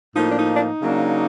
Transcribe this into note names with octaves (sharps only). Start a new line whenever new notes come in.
A2 F3 A#3 D#4
D4
D#4
D4
D#4
C#3 F#3 A#3 D4